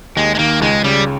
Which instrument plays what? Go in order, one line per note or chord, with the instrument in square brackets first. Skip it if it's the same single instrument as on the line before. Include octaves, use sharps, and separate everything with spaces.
[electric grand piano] D#2 [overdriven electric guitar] G#3
[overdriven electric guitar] G#3
[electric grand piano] D#3 [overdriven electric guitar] A#3
[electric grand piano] C#2 [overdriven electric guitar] G#3
[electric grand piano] C#3 [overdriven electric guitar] G3